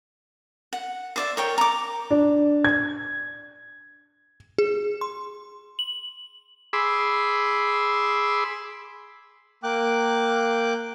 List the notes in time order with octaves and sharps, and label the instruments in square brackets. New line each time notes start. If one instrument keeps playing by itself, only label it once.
[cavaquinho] F#5
C5 D5 E5
A#4 C#5 G5
A#5 D6
[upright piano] D4
G#6
[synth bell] G#4
C6
F#7
[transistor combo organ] G#4 B5 C6 D6 E6
[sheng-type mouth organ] A#3 G5 D6 F#6